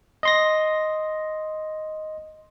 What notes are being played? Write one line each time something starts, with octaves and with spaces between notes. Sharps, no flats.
D#5 C6 A#6